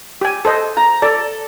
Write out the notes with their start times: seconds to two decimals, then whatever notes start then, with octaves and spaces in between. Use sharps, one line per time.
0.21 G4 G#5
0.45 A4 C5 D#5
0.77 A#5
1.02 A4 D5